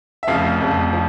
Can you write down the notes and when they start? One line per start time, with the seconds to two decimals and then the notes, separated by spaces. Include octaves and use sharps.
0.23 E5
0.27 F1 F2 C#3 F3 F5
0.61 F1 F2 C#3 F3
0.93 F3